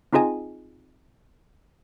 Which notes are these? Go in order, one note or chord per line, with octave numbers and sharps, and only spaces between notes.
C4 D#4 F4 G#4 D#5 G#5